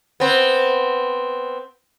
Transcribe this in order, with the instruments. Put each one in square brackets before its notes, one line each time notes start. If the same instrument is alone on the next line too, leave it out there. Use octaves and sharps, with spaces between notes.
[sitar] B3 C4